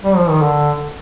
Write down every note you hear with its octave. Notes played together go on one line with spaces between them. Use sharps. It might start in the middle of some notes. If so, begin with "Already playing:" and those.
G3
F3
D#3
D3